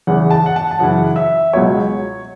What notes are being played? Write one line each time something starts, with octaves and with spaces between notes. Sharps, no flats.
E2 C#3 E3 F#5
A5
F#5
A5
A5
F#2 C#3 E3 F#5
E5
C#2 B2 F#3 C#5